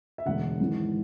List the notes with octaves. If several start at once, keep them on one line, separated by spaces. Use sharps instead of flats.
E5
E1 D2 D3 F#5
G#1 G#2 E3